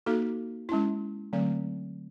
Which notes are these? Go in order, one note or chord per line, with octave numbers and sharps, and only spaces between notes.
A#3 D#4 F#4 A4
G#3 C#4 E4
D3 F#3 A3 C4